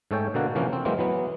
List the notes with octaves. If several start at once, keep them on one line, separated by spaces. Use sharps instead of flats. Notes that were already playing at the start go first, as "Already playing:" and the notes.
G#2 A3 A4 C#5 G5 G#5
B2 D3 A#3 F#4
C3 E3 F3 A#3 C#4
C4
E3 F#3 G#3 A#3 C4
E3 F#3 B3